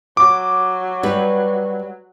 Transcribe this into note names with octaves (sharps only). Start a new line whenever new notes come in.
F#3 D6
G3 B4